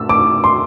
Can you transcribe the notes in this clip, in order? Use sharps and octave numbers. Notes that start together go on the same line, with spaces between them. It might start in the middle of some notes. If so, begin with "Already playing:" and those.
Already playing: E6
D6
C6